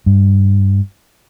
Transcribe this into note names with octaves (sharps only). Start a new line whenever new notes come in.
G2